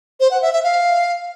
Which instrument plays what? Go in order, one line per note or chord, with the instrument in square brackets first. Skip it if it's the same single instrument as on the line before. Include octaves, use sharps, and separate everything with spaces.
[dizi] C5
F#5
E5
E5
F5